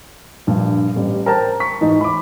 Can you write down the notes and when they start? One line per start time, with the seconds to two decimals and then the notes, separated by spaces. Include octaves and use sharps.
0.47 A#1 G2
0.96 A1 G3
1.26 A#4 C5 G5 A5 A#5
1.60 C#6 B6
1.81 G#2 E3 D#4
2.01 B5 D6